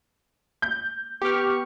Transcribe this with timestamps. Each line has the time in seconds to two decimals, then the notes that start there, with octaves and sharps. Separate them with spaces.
0.62 G6
1.22 B3 G4 C#6 F6